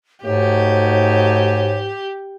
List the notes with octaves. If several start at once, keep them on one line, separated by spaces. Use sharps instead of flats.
G#2 A3 D#4 F#4 G4 C#5